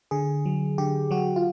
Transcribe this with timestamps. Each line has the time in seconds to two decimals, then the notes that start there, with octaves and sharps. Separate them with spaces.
0.11 D3 G#4
0.46 F#3
0.78 D3 G4
1.11 F#3 F#4
1.36 F4